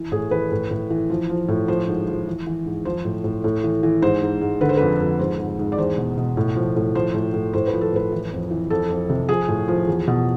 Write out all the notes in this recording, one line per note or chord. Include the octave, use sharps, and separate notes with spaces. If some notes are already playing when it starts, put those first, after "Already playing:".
Already playing: E3
A2 G#4
E3 B4
A2
A2
E3
F3
F3
A2
F3 C5
G#2
F3
E3
E3
G#2
F3 C5
A2
A2
A2
E3
E3
G#2 C5
G#2
G#2
D3 B4
C5
F2 B4
F2
G#2 C5
G#2
G#2
D5
E2 C5
B2
B2
A2
F3
A2
F3 C5
A2
A2
A2 C5
B4
F3
A4
A2 B4
E3
F2
E3
F2 A4
F2
C3
F3 G#4
A2
F3
E2
B2